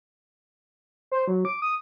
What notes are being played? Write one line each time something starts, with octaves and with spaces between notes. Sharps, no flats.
C5
F#3
D6
D#6